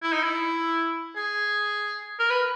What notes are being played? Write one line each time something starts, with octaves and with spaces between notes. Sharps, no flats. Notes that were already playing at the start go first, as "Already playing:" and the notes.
E4
D#4
E4
G#4
A#4
B4